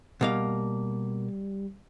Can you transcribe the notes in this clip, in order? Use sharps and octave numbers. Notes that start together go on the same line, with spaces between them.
B2 G3 A#3 F5